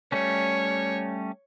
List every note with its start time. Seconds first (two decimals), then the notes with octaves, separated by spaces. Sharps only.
0.12 G3 A3 C#4 C#5